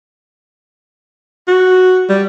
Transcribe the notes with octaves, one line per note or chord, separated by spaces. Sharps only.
F#4
G3